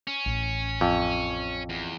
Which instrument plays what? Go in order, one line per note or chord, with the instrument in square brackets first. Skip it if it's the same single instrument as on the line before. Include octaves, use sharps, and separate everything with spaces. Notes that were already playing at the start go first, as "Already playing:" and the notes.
[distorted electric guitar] C#4
[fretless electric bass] A1
[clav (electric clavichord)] F2
[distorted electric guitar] E2